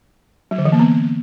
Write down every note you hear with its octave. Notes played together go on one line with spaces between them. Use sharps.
F#3
D3
E3
A#3
B3